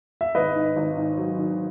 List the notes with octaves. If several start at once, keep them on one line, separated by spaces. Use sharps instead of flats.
E5
G#1 B4 D#5
G#2
G#1
G#2
F#3
D#3